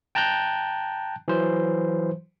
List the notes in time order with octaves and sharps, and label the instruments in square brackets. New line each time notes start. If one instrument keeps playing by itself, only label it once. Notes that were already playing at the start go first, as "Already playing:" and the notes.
[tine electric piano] G5 A5 A#5 F#6 G6
E3 F#3 C5